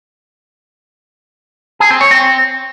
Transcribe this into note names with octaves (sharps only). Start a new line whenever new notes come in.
G#4
C4
C#5
C4